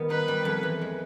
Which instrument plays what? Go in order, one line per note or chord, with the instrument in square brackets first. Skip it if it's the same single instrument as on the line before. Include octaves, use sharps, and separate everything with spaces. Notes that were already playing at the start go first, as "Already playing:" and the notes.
Already playing: [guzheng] D#3 G3 B3
[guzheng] D#4 [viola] B4
[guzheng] G3
F2
E3
G#3